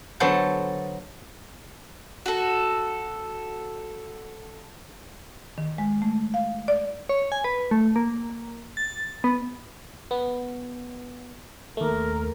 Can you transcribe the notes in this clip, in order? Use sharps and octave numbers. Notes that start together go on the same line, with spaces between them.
D3 F#3 B3 A4 C5 A5
F#4 A4
D#3
G#3
A3
F5
D5
C#5
G#5
B4
A3
A#3
A6
B3
B3
D#2 A3 A#4